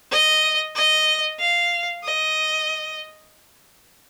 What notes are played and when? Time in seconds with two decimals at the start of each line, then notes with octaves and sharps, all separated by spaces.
0.12 D#5
0.76 D#5
1.40 F5
2.04 D#5